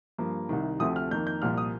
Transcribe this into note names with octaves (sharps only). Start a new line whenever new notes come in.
G2 F3 A#3
C2 C3 D#3
D2 C3 F3 A3 C4 D#6
F6
F2 D#3 A#3 G6
G6
C2 A#2 F3 A#3 F6
D#6